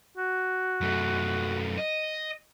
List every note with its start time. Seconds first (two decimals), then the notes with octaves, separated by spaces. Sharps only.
0.17 F#4
0.81 F#2 A3
1.78 D#5